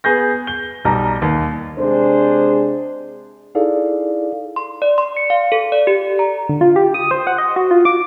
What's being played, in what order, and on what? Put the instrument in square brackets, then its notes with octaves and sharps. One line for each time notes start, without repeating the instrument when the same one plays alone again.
[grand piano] B3 G#4 G6 A#6
G7
B1 G3 A#5
D#2
[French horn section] C3 G#3 D4 G#4 C5
[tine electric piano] D#4 E4 G#4 A4 D5 F5
[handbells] C6
D5
C6
C#7
F5
A4
D5
G4
A#5
[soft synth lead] D3
F4
G4
D#6
C5
F#5
D#5
F#4
F4
D6